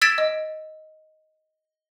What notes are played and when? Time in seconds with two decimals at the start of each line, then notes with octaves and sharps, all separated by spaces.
0.02 E6 G#6 A6 B6 D7 E7
0.18 D#5